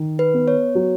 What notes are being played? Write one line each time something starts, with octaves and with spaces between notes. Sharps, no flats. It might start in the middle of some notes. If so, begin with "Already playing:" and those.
Already playing: D#3
B4
B3
C#5
F#3